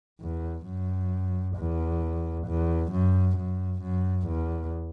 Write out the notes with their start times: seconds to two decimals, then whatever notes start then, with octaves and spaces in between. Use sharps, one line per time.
0.21 E2
0.67 F#2
1.57 E2
2.47 E2
2.92 F#2
3.37 F#2
3.82 F#2
4.28 E2